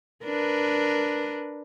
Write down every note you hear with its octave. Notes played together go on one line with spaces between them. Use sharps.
D4 A#4 B4